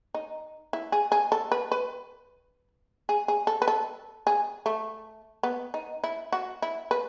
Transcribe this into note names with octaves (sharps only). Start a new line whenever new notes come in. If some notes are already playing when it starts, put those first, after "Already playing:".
D#4
E4
G#4
G#4
A4
B4
B4
G#4
G#4
A4
B4
A4
G#4
A3
B3
D#4
E4
F#4
E4
B4